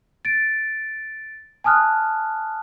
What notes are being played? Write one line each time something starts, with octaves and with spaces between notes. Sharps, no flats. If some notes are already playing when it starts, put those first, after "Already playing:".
A6 D7
G#5 A5 D#6 F6 F#6